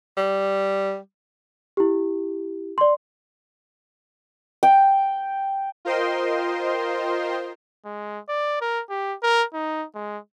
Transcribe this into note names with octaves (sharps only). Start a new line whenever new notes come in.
G3
E4 G4
D5 C6
G5
F4 A#4 C5 D#5 G5 C6
G#3
D5
A#4
G4
A#4
D#4
G#3